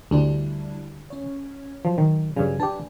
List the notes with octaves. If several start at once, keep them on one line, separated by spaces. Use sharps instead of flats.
D2 G3 D4 E4
C#4 C#5
F3 F#3
D#3
G2 C#3 F#3 G#5
D4 G4 B4 A5